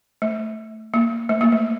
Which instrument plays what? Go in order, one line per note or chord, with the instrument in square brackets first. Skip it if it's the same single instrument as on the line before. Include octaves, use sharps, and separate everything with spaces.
[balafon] A3
A#3
A3
A#3
A3